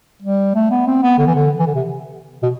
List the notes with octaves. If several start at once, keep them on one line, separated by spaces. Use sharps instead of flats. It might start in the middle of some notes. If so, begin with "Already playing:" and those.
G3
A3
B3
C4
B3
D3
E3
D3
E3
D3
C3
B2